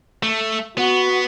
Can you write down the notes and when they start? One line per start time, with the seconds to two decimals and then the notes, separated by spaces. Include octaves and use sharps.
0.23 A3
0.77 B3 F#4